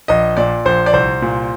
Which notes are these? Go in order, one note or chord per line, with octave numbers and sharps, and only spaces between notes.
A#1 D#5
A#2 D5
A#1 C5
D5
C2 C5
A#2